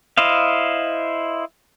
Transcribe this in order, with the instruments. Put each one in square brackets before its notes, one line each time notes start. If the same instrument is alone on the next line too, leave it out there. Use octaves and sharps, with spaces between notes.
[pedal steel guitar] E4 C5 D#5 F5